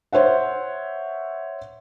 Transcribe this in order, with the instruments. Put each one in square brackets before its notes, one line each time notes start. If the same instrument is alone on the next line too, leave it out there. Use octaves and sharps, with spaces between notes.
[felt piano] C5 C#5 E5 F#5